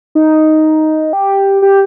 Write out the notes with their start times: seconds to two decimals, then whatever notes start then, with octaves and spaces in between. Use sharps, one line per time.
0.15 D#4
1.13 G4
1.62 G4